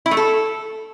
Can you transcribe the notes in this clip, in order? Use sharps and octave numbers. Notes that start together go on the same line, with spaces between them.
E4
A3
A4